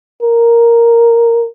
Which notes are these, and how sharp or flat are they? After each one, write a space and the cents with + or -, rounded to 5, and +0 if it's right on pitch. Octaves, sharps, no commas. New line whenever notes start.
A#4 +0